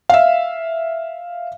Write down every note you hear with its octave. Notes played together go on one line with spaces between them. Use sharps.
E5 F5